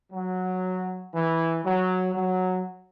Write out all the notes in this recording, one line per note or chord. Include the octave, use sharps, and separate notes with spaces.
F#3
E3
F#3
F#3